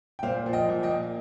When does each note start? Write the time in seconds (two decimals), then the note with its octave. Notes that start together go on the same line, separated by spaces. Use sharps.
0.19 G5
0.23 A#2 C5 F5
0.46 F3
0.53 D#5 G5
0.69 A#2
0.83 D#5 G5
0.91 A#3